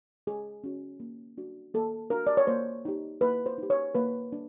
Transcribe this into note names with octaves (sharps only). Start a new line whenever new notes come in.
G#3 G#4
C#4 F#4
A#3
D4 F#4
A#3 A4
D4 F#4 A#4
D5
C#5
A#3 C5
D#4 G4
A#3 B4
C5
D#4 G4
C#5
A#3 B4
D4